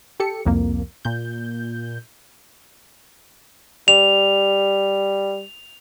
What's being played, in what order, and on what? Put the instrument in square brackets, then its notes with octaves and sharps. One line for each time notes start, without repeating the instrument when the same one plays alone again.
[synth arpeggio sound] G4 A4 C#7
C2 F2 A#3
A#2 G6
[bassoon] G3 [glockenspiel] F7